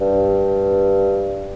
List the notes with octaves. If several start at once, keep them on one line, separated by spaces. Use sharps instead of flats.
G2